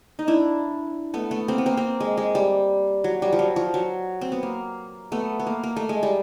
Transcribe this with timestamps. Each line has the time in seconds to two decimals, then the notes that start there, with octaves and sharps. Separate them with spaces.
0.19 D#4
0.27 D4 E4
1.14 A3 B3
1.31 A3 B3
1.48 A#3 C4
1.58 B3
1.66 A#3 C4
1.77 A#3 C4
2.00 G#3
2.17 G#3
2.35 G3
3.04 F#3
3.22 G3
3.33 F3
3.39 F#3
3.56 F3
3.74 F#3
4.21 C4
4.32 B3
4.43 A#3
5.12 A3 B3
5.39 B3
5.47 A#3
5.63 A#3
5.76 A3
5.89 G#3
6.03 G3